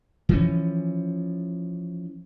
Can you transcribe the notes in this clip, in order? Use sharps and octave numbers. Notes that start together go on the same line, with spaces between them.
E3 F3 C#4